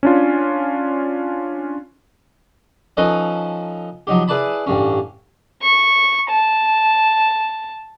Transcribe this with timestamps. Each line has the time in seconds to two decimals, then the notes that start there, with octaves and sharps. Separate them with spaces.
0.03 C#4 D4 F4
2.97 F3 C#4 D#4 A4 B4 D#5
4.07 F3 F#3 D#4 G4
4.28 E4 G#4 B4 D5 A5 B5
4.67 A1 G2 C#4
5.62 C#6
6.30 A5